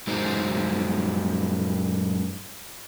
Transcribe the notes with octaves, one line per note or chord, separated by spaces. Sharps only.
F#2 F#3 G#3 D#4 C5